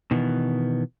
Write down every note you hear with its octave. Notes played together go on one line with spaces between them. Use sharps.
B2 D#3 E3 B3